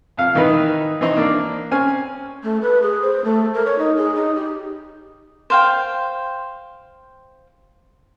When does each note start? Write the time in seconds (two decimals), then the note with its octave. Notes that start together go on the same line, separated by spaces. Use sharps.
0.17 F2 F5
0.35 D#3 E3 D#4 B4
1.01 E3 C4 D#4 D#5
1.17 A#3 D4 D5
1.71 C4 C#4 G#5 F6
2.44 A3
2.62 B4
2.82 G#4
3.02 C5
3.25 A3
3.54 A#4
3.66 C#5
3.79 D#4
3.97 G#4
4.15 D#4
4.36 G4
5.50 C5 F5 G5